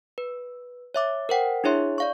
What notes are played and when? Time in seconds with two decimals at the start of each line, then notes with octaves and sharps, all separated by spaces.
0.18 B4
0.94 C#5 E5 D6
1.29 A#4 C5 F#5 G5
1.64 D4 E4 G#4 C#5 E5 C6
1.98 D5 F5 C#6